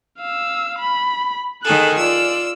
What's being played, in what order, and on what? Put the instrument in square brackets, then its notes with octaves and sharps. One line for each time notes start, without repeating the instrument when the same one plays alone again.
[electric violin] F5 E6
B5
[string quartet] D#3 G#4 A4 [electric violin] F#6
[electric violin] F4 D5 [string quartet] E6